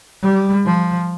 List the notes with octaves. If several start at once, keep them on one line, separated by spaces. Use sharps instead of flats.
G3
F3